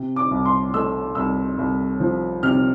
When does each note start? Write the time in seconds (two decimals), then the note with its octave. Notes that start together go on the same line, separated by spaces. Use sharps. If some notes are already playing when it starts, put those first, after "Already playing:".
Already playing: C3
0.16 D6
0.31 C2
0.45 C6
0.74 A3 E6
1.15 C2 E6
1.58 C2
2.00 F3
2.43 C3 F6